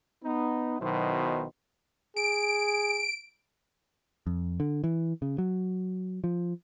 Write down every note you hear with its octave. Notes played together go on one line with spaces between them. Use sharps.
B3 D#4
B1 B2 D#3 F#3 E4 C5
G#4 D7
F2
D3
E3
C#3
F#3
F3